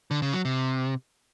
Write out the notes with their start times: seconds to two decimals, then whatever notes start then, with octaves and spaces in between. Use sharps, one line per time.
0.11 D3
0.22 C#3
0.33 F#3
0.45 C3